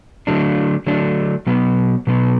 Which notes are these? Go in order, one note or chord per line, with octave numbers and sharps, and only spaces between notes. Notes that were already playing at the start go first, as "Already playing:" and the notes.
D3 F#3 A3 D4
D3 F#3 A3 D4
B2 F#3 B3
B2 F#3 B3